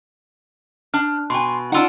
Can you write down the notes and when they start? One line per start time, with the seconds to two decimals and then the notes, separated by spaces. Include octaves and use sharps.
0.94 D4 F6
1.30 B2 G#5 C6
1.72 D4 D#4 F4 F#5 E6